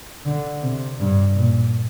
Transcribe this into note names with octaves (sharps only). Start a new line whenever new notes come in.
D3
C3
G2
A#2